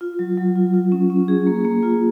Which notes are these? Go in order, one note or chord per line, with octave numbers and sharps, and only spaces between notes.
F4
F#3
F#3
F4
F4
C#4
C#4
G#4
A#3
A#3
F4